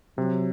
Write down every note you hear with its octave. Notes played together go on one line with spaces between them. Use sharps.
C3 F#3